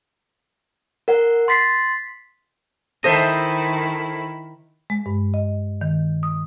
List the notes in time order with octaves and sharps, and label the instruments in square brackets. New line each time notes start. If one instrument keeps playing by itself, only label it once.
[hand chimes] A#4 F#5
C6 A6 B6 C7
[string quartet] D#3 E4 [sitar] A4 C5 E5 [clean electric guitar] D#5
[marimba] G#3
G2
D#5
D#3
D#6